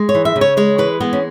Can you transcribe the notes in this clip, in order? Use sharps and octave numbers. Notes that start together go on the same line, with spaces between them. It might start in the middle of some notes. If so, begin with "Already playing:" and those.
Already playing: G#3
C#5
E3
E5
C#3
C#5
G#3 C#5
E3 B4
G#3 B3
C#4